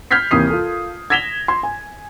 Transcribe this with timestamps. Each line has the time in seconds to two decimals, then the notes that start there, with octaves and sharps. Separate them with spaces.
0.11 F6 G6 G#6 B6 C7
0.31 D#2 C3 E3 D#6 C7
0.50 F4 A4
1.10 G#6 A#6 B6 E7 F7 G7
1.48 C6 G#6
1.63 G#5